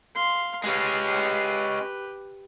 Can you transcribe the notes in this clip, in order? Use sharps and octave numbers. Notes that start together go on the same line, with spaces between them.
F5 C6
G#3 C#4 G4 B4